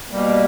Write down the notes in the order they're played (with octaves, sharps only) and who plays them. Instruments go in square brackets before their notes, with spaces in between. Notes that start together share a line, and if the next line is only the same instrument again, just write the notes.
[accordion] B2 G3 A#3